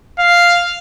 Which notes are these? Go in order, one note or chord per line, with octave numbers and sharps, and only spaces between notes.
F5